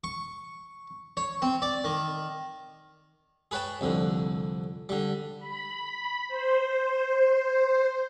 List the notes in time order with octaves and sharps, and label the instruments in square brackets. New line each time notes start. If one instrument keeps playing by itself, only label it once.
[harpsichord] C#6
C#5
C4
D5
D#3
G#4 B4 C#5 G5 A5
C2 F2 D3
D3 G3
[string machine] B5
C5